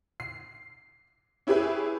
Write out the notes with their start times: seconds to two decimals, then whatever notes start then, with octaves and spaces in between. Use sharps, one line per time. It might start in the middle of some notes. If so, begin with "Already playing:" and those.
0.20 C7
1.47 C#4 E4 G4 G#4 B4 E5